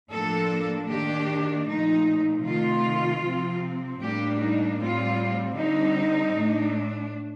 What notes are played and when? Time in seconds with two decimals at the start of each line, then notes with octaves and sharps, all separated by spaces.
0.11 A2 F3 A#3 D4 A4
0.89 D#3 A#3 D4 G4
1.67 A#2 F3 A3 D#4
2.44 C3 D#3 A3 F4
3.24 C3 F3 C4
4.01 A2 G3 A#3 D4 G4
4.40 D#4
4.79 A2 G3 C4 F4
5.57 D3 G3 C4 D#4
6.35 A2 A3 D4